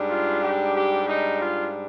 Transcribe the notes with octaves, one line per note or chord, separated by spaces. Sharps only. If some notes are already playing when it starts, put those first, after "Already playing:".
Already playing: G#2 G3 D4
F4
G4
G4
D#4
F4